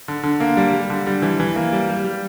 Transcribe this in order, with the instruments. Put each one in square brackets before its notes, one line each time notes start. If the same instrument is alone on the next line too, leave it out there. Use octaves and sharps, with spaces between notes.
[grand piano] D3
D3
A#3
G3
G3
D3
G3
E3
E3
A#3
G3
G3
G3